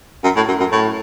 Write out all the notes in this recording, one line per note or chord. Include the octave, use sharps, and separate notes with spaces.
F#2
A2
F#2
F#2
A2